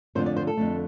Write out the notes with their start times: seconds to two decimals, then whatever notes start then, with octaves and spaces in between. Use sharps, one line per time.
0.15 F2 D3 A3 C5
0.26 D5
0.37 C5
0.47 A4
0.57 F2 D3 A3